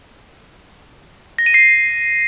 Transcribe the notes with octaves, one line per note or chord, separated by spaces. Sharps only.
A#6
D#7
C7